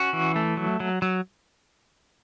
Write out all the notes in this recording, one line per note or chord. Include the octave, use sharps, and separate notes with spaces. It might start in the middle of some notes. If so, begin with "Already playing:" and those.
Already playing: C#4 F#4
E3
A3
F#3
F#3
F#3